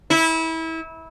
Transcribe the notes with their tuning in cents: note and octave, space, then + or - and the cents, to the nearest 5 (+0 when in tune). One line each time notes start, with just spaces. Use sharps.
E4 -25